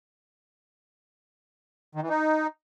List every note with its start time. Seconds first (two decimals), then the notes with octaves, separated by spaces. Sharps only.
1.95 D#3
2.02 E3
2.09 D#4